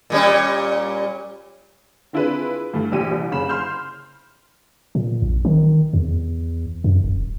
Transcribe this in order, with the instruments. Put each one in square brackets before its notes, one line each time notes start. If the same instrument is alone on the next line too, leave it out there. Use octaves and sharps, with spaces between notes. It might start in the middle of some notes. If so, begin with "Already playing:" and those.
[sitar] A#2 G3 C#4
[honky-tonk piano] C4 D4 E4 F4 G#4 B4
G2 E3 A3
A#1 E3 G4 D#7
C2
F#1 C#3 B5 E7
C6 F6 G6
[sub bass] A#2
A#1
D#3
E2
F#2
D#1